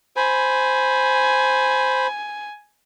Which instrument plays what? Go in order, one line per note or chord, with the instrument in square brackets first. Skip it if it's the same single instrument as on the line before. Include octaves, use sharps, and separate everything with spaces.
[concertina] C5 B5 [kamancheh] G#5